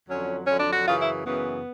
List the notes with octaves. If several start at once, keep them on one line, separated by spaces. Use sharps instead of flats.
F2 D3 F#3 C#4
F2 D3 F#3 C#4
D4
F#4
F#2 C#3 E3 F4
E4
F#2 C#3 E3 B3